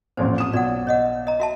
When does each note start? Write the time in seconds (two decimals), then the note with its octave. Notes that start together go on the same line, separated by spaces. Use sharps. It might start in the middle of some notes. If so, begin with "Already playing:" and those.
0.17 A1 F2 A#2 C5
0.38 D#6 E7
0.53 B1 D5 F#5
0.87 C#5 D#5 F#5
1.27 D#5 A#5
1.40 F#4 E5 A5